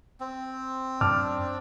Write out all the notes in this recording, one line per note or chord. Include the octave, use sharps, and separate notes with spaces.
C4
F#2 D4 A5 D6 F6